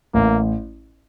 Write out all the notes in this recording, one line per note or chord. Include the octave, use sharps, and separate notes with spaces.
A1 A#3